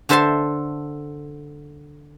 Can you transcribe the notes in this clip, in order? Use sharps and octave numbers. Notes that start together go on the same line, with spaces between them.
D3 A4 C5 E5 A5 C6